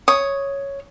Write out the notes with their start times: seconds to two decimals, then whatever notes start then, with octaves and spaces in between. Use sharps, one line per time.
0.08 C#5 D#6